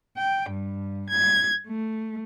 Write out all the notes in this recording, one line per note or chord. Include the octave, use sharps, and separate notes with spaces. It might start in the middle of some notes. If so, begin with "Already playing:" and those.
G5
G2
G#6
A3